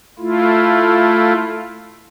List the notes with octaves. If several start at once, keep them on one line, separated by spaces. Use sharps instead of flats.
A3 E4 F4